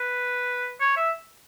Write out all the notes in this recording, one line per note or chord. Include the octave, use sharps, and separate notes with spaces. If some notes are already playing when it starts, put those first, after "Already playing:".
Already playing: B4
C#5
E5